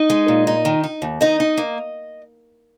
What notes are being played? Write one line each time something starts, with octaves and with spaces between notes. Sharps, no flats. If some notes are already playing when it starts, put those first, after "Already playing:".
Already playing: D#4 D#5
G#3
A#2
D#4
D#3
D#4
D#2
D#3 D#4 D#5
D#4
A#3